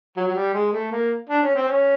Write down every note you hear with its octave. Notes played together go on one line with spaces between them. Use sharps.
F#3
F#3
G3
G#3
A3
A#3
D4
C#4
C4
C#4